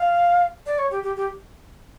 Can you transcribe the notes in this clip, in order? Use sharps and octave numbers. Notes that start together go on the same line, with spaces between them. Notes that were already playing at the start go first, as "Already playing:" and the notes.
Already playing: F5
D5
C#5
G4
G4
G4